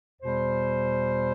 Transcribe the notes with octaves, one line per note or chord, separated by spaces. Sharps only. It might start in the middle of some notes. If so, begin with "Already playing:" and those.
E2 B2 G3 C5